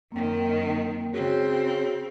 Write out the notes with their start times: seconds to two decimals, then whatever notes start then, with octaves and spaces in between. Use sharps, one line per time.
0.12 F#2 D#3 A#3 C4 G5
1.14 C#3 C4 F#4 G#4 C#5